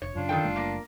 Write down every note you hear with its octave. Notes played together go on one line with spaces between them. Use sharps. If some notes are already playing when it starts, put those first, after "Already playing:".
F1 C#5
F#2 C#3 D4 F4
D#3 A4 G5
F#1 G3 A3
A#3